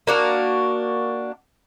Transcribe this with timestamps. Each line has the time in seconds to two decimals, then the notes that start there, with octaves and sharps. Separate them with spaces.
0.07 A#3 D4 F#4